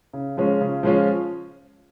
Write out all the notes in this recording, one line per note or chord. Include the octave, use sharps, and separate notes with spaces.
C#3
F3 G#3 C#4 F4
C#3
F3 G#3 C#4 F4